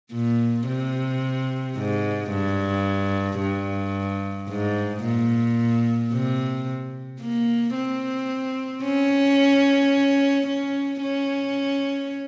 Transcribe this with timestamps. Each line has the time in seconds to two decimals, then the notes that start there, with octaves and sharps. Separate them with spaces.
0.14 A#2
0.68 C3
1.77 G#2
2.31 G2
3.40 G2
4.49 G#2
5.04 A#2
6.13 C3
7.21 A#3
7.75 C4
8.84 C#4
10.47 C#4
11.02 C#4